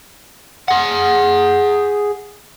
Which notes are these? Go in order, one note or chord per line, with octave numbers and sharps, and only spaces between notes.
G#4 F#5